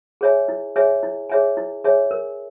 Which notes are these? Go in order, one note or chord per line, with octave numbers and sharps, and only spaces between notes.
G#4 C#5 E5 G#5
E4
G#4 C#5 E5 G#5
E4
G#4 C#5 E5 G#5
E4
G#4 C#5 E5 G#5
A#4